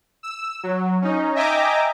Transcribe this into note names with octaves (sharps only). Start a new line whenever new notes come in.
E6
F#3
C#4 D#4
D#5 E5 G5 G#5 A#5 D6